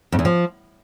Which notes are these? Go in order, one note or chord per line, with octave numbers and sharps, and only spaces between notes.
F2
E2
F3